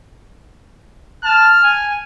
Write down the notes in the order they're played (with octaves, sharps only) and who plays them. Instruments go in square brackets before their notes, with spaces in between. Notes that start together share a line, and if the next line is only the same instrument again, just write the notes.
[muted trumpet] A5 [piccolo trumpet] F6
[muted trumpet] G#5